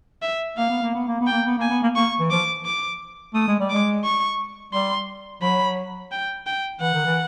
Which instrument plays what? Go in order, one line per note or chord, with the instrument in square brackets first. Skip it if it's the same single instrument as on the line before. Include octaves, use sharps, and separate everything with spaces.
[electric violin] E5
[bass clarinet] A#3 [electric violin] F5
[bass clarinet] B3
A#3
B3
A#3
B3
[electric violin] G5
[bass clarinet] A#3
B3
[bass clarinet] A#3 [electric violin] G#5
[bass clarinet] B3
A#3
[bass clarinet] A#3 [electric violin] C#6
[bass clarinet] E3
[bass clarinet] F3 [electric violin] D6
[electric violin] D6
[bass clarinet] A3 [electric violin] D#6
[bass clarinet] G#3
G3
[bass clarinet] G#3 [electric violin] D6
[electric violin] C#6
[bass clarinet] G3 [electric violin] C6
[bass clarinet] F#3 [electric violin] B5
[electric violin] G5
G5
[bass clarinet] E3 [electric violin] F#5
[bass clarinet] D#3
E3